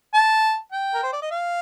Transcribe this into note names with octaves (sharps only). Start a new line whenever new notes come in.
A5
G5
A#4
C5
D5
D#5
F5